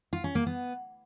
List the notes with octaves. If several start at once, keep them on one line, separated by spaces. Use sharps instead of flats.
F4
C#4
A#3
B3